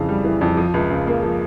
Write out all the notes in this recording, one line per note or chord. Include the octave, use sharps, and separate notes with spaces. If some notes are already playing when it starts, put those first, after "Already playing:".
Already playing: F2 C#3 E3
G3
E3
F2
F3
C#2
C#3
A#3
F3